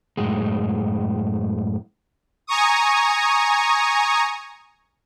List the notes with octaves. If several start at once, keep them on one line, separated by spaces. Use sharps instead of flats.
F#2 A2 G#3
G#5 A#5 C#6 D#6